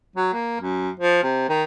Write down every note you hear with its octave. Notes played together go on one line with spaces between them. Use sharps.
F#3
A#3
F#2
F3
C3
D#3